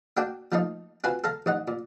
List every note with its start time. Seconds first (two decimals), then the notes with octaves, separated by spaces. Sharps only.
0.17 A#3 D4 F#4 G5 D6
0.52 F3 A3 A#3 D#4
1.04 C4 F4 F#4 B4 G#5
1.24 A4 F5 A#5
1.46 A1 D#4 F#5
1.68 A#2